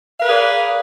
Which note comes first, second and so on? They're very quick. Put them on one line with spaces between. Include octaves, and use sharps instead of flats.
F5 B4 A#4 G#4 D5